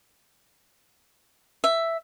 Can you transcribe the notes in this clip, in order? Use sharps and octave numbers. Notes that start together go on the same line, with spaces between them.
E5